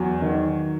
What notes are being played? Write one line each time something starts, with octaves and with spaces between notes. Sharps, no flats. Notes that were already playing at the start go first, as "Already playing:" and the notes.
Already playing: E2 F#3
D#3